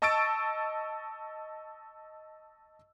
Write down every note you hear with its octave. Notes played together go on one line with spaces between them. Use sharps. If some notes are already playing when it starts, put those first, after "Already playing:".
D#5 A5 C#6 E6 A6 D7